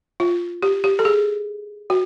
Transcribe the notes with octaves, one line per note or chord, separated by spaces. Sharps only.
F4
G4
G4
A4
G#4
F#4